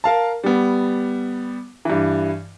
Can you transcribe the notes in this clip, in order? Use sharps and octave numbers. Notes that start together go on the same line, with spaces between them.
A#4 F5 A5
G3 B3
G2 E3